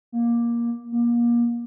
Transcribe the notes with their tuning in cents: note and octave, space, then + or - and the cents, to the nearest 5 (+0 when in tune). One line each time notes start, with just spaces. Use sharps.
A#3 +15
A#3 +30